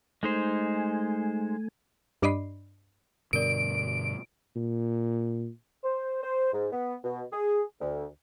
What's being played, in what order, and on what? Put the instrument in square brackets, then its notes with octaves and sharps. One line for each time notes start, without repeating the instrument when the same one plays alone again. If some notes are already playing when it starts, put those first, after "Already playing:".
[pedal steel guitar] G#3 D#4 C5 [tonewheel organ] A3 G#5
[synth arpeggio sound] G2 D4 D5 D#5 B5 C7
[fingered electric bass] G2 B2 D3 [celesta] A#4 D5 [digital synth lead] D7
[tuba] A#2
[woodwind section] C5
C5
G#2
B3
B2
G#4
D2